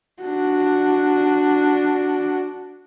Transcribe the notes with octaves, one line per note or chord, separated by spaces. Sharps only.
D4 F#4